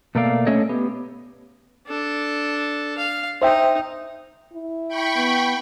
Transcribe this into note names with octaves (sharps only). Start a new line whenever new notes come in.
B2 A3 A#3 A4 D5 F5
A3 C#4 D4 A4 C#5 D#5
B3 G4
D4 A4
F5
D#4 C5 E5 G5
E4
G5 B5 C#6
B3